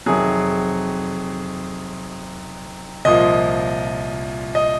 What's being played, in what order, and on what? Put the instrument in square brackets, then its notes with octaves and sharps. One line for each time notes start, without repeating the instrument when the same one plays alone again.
[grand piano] F2 C3 D#3 F#3 G#4
C2 A#2 F3 D#5
D#5